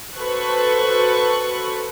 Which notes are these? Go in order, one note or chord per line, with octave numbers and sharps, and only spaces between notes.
F#4 A4 B4 C5 C#6 F#6